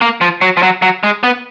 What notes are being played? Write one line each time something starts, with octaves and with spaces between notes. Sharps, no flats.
A#3
F3
F#3
F3
F#3
F#3
G#3
B3